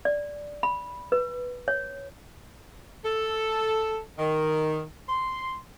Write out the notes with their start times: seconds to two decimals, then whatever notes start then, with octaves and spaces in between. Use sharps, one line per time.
0.05 D5
0.63 B5
1.12 B4
1.68 C#5
3.05 A4
4.19 D#3
5.09 C6